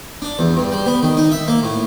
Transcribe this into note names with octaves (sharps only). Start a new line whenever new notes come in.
D4
E2
G2
G3
B3
D#3
D#4
E5
A#3
A2